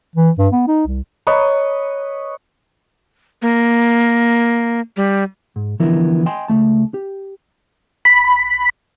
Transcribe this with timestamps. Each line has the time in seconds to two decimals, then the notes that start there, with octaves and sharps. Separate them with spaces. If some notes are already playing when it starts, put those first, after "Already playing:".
0.15 E3
0.38 G2
0.52 B3
0.68 D#4
0.87 C2
1.27 B4 C#5 D#5
3.42 A#3
4.97 G3
5.56 G#2
5.80 D3 E3 F3 B3 E4 A#4
6.26 D#5 G5 G#5 C6
6.48 C#2 D#3 A3 A5
6.94 G4
8.05 B5